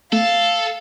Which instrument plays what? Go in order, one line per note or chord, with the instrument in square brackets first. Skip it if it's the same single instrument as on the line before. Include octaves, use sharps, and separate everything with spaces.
[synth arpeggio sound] A3 [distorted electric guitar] A4 [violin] F5